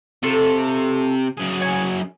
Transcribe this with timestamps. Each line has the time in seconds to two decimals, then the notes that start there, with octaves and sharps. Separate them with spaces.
0.23 C3 A3 F4 A4
1.37 F#2 G#4
1.61 C#5 G#5